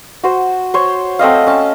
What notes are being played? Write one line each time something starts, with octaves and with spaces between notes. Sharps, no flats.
F#4 C5
C5 C#5
A3 C4 D#5 F5
C#4 A5